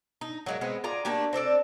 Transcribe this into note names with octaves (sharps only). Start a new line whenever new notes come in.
D#4
F#3 G#3 A#3
G#3 B3 C4
F4 G#4 D5 A#5
A3 A#3 D4 G4
C4 D4 A4 D5